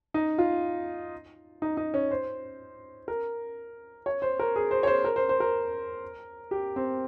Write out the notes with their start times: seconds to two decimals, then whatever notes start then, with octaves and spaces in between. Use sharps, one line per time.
0.14 D#4
0.38 F4
1.62 D#4
1.77 D#4
1.94 C#4
2.11 C5
3.08 A#4
4.06 C#5
4.22 C5
4.39 A#4
4.56 G#4
4.71 C5
4.83 C#5
4.87 C5
5.05 A#4
5.16 C5
5.29 C5
5.40 A#4
6.51 G4
6.76 C4